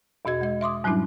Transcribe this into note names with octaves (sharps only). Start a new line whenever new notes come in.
E2 B2 F#4 D#5 G#6
G#3 D#5
E5 C6 D6 D#6
G#2 F#3 G3 C#4 D4 E4